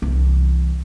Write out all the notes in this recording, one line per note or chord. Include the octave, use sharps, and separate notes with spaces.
C2 E3